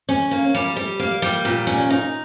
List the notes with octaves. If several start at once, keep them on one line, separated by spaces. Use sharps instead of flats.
C#4
A#3
G3
G3
A#3
G3
A#2
C#4
D#4